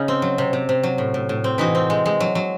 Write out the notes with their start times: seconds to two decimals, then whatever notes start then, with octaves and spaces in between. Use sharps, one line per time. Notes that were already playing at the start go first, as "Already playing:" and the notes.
Already playing: C#3 C#4 D#4
0.08 C4
0.22 F#3
0.38 C3
0.53 C3
0.69 C3
0.83 F#3
0.98 A2
1.14 A2
1.29 A2
1.44 C4
1.58 E3 D#4 F#4
1.75 C4
1.90 G#3
2.06 G#3
2.20 F#3
2.35 F#3